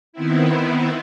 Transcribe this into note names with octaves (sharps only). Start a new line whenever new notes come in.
D#3 B3 C4 E4